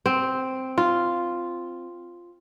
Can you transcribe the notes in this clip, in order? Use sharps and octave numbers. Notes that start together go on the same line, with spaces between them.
C4
F4